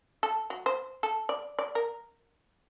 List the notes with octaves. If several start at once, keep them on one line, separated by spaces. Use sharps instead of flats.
A4
F#3
C5
A4
D5
D5
A#4